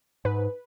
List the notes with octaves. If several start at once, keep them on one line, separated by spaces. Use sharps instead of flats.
G#2 B4